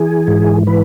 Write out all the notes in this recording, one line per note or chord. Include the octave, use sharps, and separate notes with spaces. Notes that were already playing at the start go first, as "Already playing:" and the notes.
Already playing: E3 G#4
G#2
E3 B4